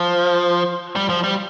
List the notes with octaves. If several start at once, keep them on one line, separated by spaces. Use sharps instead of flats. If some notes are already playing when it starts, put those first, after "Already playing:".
Already playing: F3
G3
F3
G3